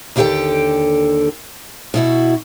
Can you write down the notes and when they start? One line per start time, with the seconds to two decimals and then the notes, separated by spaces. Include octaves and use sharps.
0.16 D#2 D3 E4 G4 A4 G5
1.94 B2 E4 F#4